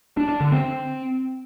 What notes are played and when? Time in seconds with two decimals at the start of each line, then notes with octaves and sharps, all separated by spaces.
0.17 D4
0.29 D4
0.40 D3
0.52 C4